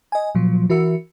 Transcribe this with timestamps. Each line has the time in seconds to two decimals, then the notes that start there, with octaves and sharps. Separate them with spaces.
0.12 D#5 G#5
0.35 A#2 F3 F#3
0.69 E3 F#4 A#4 E5 E6 C#7